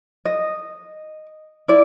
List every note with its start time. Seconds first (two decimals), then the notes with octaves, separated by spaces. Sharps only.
0.25 D#5
1.68 E4 D5